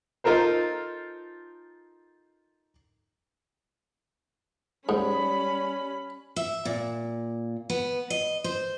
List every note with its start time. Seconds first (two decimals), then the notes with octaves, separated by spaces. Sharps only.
0.24 D#4 F4 A4 A#4 C5
4.89 G#2 G3 C#4 B5
6.36 E5
6.65 A#2
7.70 B3
8.10 D#5
8.44 C5